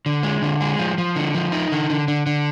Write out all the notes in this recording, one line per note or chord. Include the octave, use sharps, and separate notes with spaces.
D3
G#3
D3
G#3
F3
F3
D3
F3
D#4
D3
D3
D3
D3